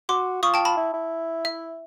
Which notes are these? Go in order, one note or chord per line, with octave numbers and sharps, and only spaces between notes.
F#4 C6 D6
F4 C#6 D#6
G5 A5
A5 B5
E4
E4
E5